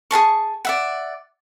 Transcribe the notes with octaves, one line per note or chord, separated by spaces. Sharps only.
G#4 C5 A5 C#6
D5 E5 F#5